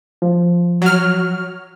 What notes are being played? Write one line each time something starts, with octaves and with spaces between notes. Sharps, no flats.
F3
F#3 F6